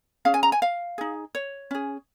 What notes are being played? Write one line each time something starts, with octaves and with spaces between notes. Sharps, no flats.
C#4 G#4 F5
G#5
A#5
G#5
F5
D#4 G#4
C#5
C#4 G#4